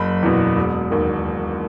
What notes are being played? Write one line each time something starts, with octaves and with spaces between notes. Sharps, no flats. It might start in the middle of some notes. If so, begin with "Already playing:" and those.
Already playing: F#1 B5
E2 B2
E1
D#2 D#3